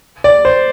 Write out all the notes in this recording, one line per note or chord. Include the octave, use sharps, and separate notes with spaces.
D5
C5